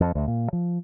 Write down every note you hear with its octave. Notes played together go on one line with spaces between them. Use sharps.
F2
D2
A#2
F3